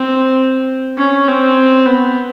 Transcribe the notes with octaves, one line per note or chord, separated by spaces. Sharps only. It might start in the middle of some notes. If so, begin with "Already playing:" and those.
Already playing: C4
C#4
C4
B3